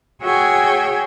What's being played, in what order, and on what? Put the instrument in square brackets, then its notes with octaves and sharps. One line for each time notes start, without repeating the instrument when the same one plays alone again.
[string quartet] F#4 G#4 C#5 E5 G5 G#5